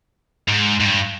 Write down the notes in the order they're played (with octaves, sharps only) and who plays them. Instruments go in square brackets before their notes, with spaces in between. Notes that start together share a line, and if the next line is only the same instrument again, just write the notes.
[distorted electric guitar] G#2
G#2
G2